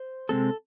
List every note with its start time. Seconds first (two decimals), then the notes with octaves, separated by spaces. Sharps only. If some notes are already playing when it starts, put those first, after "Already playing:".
Already playing: C5
0.29 C3 G#3 C4 A4